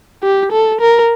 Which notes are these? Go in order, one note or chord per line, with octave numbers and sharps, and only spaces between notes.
G4
A4
A#4